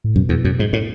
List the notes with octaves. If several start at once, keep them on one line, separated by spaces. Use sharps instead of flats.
A2
F#2 B2
E2
F#2
G#2
A2